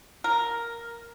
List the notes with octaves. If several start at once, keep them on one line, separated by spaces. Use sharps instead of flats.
A#4